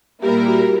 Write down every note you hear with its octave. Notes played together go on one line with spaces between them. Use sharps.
A#2 G3 A#3 E4 G4 A#4
F#4